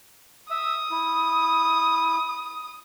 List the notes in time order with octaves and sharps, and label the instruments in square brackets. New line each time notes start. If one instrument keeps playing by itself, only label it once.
[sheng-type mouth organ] E5 E6 [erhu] D#6
[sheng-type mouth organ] E4